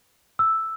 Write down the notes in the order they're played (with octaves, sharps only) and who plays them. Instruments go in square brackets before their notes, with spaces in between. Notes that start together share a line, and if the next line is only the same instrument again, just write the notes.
[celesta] E6